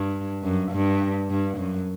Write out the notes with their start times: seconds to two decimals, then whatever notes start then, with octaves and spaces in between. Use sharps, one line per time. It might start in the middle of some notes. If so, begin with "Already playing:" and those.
Already playing: G2
0.43 F#2
0.72 G2
1.30 G2
1.58 F#2